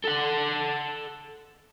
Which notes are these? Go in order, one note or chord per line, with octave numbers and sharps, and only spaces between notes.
A4 F#5